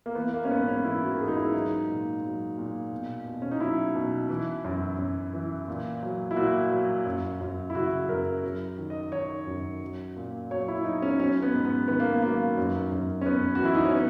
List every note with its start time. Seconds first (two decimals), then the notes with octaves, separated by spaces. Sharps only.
0.06 A#3
0.15 E3 B3
0.34 A#3
0.45 C#4
0.50 G#2 B3
0.68 C#4
0.84 E3 E4
1.02 F#4
1.14 A#4
1.19 G#2 G#4
1.28 D#4
1.36 E4
1.53 F#3 D#4
1.88 A#2
2.23 F#3
2.58 A#2
2.92 B2
3.26 B2
3.42 C#4
3.51 D#4
3.60 F#3 E4
3.95 B2
4.29 E3
4.65 F#2
4.98 F#2
5.33 E3
5.68 A#2
6.03 F#3
6.31 E4
6.36 A#2 F#4
6.72 F#3
7.06 F#2
7.41 F#2
7.70 E4
7.75 C#3 F#4
8.09 F#2 A#4
8.43 F#3
8.78 D#3
8.90 D#5
9.12 D#3 C#5
9.47 F#2
9.82 F#3
10.16 A#2
10.51 F#3 C#5
10.68 E4
10.84 F#3 D#4
11.02 C#4
11.20 F#3 C#4
11.43 B3
11.54 G#2
11.65 B3
11.88 D#3 B3
12.00 A#3
12.22 F#3 A#3
12.57 F#2
12.92 F#2
13.21 C#4
13.26 F#2 B3
13.55 F#4
13.61 E3 E4
13.75 D#4
13.85 C#4
13.95 B3